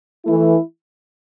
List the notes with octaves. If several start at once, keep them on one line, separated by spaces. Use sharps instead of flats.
E3 A3 E4